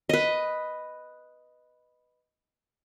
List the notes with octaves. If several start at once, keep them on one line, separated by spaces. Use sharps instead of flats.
B4 D#5